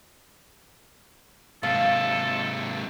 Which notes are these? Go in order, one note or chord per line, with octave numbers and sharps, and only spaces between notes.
G#2 C3 A4 F5